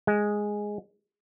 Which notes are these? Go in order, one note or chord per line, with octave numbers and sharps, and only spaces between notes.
G#3